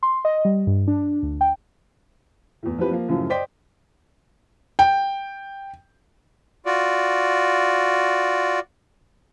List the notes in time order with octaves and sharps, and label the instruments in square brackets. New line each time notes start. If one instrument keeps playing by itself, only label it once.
[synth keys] C6
D#5
G3
G2
D4
D2
G5
[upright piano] E2 A2
F3 C4 E4 G4 B4
F3 A#3
F#2 A2 C#3 F3
C5 D5 D#5 G5 C6 B6
[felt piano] G5
[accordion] F4 F#4 D5